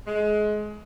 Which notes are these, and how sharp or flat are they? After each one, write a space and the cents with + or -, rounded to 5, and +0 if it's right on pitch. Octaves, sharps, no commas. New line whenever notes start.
G#3 +25